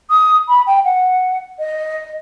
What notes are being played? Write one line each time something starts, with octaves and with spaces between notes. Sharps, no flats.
D#6
B5
G5
F#5
D#5